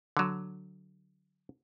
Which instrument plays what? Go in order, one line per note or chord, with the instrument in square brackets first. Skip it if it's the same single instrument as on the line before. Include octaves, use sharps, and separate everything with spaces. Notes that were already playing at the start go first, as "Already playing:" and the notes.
[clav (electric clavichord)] D3 F#3